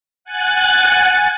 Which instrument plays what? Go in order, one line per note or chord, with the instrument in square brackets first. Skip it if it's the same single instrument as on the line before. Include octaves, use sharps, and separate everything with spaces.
[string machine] F#5 G#5 F#6 A6